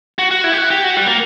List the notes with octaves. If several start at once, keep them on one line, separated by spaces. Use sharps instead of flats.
F#4
F#4
E4
G4
F#4
G4
F#4
G3
A#3